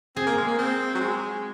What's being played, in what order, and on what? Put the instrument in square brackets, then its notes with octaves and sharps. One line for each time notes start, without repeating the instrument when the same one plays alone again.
[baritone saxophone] C4 [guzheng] G#4
[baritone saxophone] A#3
G#3
A#3
C4
F#3
G#3